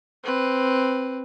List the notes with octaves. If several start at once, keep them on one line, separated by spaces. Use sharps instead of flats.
C4 B4